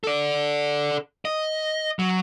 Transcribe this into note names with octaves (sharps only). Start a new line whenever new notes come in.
A4 D5
D#5
F#3